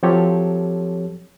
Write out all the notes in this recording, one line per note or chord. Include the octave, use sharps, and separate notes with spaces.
F3 F#3 C4 G4 A4 C#5